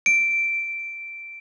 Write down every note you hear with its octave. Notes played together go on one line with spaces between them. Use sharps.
D7